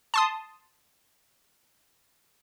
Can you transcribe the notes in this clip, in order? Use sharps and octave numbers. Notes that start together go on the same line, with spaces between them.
A5 C6 D#6